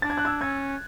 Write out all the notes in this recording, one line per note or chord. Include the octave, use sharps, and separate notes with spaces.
D4 A6
G#6
F#6
E6 G#6
C#4 E6 G#6